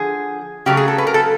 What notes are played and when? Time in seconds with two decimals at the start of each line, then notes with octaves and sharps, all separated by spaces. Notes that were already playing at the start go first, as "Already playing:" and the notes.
Already playing: D3 F3 G#4
0.66 C#3 F#3 A3 G4
0.77 G#4
0.88 A4
0.98 B4
1.07 A#4
1.14 A4